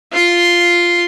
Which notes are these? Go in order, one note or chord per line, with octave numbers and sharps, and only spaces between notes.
F4 C6